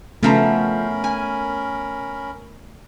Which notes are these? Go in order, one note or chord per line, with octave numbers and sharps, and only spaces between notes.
C#3 F3 A3 B3 C#4 A#4 A#5 B5
G#5